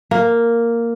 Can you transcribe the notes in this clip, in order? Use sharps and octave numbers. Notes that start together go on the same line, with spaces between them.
A#3